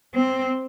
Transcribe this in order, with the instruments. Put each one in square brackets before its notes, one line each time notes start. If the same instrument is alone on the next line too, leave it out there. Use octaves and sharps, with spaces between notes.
[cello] C4